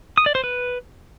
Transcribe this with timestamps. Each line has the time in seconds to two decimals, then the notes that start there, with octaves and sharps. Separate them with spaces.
0.18 D#6
0.26 D5
0.35 C5
0.44 B4